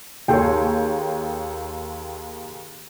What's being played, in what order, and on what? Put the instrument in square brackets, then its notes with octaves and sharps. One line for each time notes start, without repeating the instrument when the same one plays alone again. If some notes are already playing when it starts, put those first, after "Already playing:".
[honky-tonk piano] D#2 C#5 [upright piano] G#4 A4 C6 [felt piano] G5